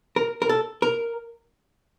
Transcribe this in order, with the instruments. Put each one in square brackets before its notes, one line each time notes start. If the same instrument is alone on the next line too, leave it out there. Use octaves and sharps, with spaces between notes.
[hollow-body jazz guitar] A#4
A#4
A4
A#4